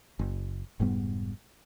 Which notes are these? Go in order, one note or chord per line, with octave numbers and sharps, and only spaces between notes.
F#1
F1 G#2 G3 B3